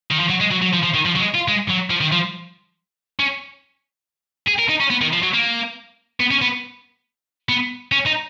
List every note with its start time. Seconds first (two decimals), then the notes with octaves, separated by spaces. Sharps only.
0.11 D#3
0.19 F3
0.29 F#3
0.40 G#3
0.51 F#3
0.62 F#3
0.73 F3
0.83 F3
0.94 D#3
1.05 F3
1.15 F#3
1.19 G#3
1.34 F4
1.48 G#3
1.70 F#3
1.91 F3
2.01 D#3
2.12 F3
3.20 C#4
4.48 G#4
4.59 A#4
4.69 D#4
4.81 C#4
4.91 B3
5.02 D#3
5.13 F3
5.23 F#3
5.34 A#3
6.20 B3
6.31 C#4
6.42 B3
7.49 B3
7.92 C#4
8.06 D#4